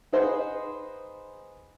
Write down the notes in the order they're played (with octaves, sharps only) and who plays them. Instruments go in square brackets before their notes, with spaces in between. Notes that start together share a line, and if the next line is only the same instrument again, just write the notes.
[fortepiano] D#4 G#4 B4 C5 D#5 F#5